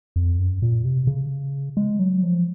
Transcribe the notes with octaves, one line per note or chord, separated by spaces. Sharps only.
F2
F#2
A#2
C3
C#3
G#3
F#3
F3